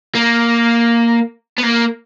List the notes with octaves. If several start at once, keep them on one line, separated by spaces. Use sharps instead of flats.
A#3
B3
A#3